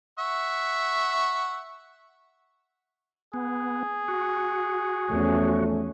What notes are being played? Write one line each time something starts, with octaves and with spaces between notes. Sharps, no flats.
E5 F#5 C#6
B3 G#4
F#4
E2 F3 A3 C#4